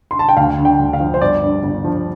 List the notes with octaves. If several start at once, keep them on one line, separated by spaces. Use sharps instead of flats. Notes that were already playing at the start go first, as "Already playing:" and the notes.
C6
A5
G5
D2 F5
D3
G5
D2
F5
F3
C5
G1 D5
G2
G1
F3